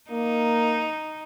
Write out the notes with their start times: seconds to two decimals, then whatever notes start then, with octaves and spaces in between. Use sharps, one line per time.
0.11 A#3 D#4